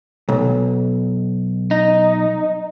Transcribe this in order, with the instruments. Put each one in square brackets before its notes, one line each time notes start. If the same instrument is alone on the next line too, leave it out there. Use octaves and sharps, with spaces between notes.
[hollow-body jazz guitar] B1
[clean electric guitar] D#4